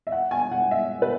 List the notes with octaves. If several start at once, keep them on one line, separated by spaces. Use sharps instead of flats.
E5
F#5
G#5
F#5
E5
B4